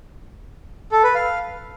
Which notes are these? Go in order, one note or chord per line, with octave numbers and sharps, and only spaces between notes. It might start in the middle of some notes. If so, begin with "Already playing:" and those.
A4
B4
F5